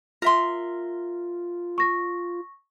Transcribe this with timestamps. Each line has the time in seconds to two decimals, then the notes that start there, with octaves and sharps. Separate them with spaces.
0.22 F4 A#4 E5 C6
1.78 C#6 A#6